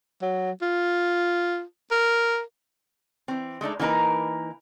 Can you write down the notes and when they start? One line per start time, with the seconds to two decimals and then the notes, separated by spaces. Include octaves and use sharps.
0.22 F#3
0.62 F4
1.91 A#4
3.28 E3 C4
3.61 G#3 A3 D4 D#4
3.79 E3 A#3 D#4 A#4 B4